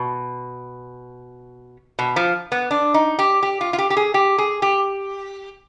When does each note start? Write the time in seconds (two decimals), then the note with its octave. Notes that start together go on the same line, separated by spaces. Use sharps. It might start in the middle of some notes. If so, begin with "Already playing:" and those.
Already playing: B2
1.99 B2
2.16 F3
2.52 B3
2.71 D4
2.94 D#4
3.19 G4
3.43 G4
3.61 F4
3.73 F4
3.78 G4
3.90 G4
3.97 G#4
4.14 G4
4.38 G#4
4.62 G4